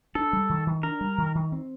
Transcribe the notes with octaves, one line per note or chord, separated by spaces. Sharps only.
D4 A4
G3
D#3
D#3
D4 A#4
G3
D#3
D#3
C4